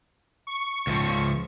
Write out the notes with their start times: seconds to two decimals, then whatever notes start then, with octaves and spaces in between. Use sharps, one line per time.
0.47 C#6
0.87 C#2 F3